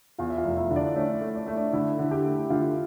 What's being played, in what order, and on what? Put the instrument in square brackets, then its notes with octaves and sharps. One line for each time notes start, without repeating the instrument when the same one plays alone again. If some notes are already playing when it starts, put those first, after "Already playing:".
[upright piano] E2 [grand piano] F4 F5
[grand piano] E5
F4 F5
[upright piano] F1
[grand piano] E4 E5
[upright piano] D3
[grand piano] D4 D5
[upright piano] A3 [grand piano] C#4 C#5
[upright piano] A3
[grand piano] D5
[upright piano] A3 [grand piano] E5
[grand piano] D4 D5
[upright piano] D3 [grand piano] E4 E5
[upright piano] D3
[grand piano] G4 G5
[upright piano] A3
[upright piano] D3 [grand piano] F4 F5